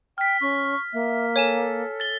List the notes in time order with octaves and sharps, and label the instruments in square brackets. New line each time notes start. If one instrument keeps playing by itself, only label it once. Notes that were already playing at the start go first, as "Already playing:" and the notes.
[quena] G5 [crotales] F6 B6
[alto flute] C#4 [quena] C#6
[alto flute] A#3 [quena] E5
[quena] A4 [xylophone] C#5 G#5 E7
[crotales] A6 G7